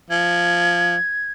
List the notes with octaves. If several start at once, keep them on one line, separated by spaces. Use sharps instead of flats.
F3 G#6